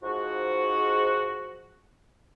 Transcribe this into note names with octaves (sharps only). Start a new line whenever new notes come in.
G#2 F3 F#4